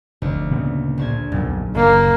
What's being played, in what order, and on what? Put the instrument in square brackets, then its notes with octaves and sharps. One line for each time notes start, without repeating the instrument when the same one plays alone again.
[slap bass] F1 [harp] D2
[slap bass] A#2 C#3 B3
[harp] A#1 C5 G#6
[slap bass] B1 F2 [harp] A#2
[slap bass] F#1 [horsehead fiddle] A#3